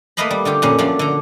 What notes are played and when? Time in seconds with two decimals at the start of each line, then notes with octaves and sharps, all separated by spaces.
0.17 A3 A#3 B4 D#5 F5 B5
0.31 G3
0.45 D3 F4 G4
0.62 F2 A#2 C#4
0.78 A#2 F3 F#3 A3 D4
0.99 D3 A#5